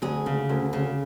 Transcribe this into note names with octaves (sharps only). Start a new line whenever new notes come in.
D2 G#4
C#3
D2
C#3